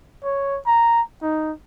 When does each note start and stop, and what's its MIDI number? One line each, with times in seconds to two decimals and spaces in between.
0.24 0.59 73
0.67 1.01 82
1.22 1.53 63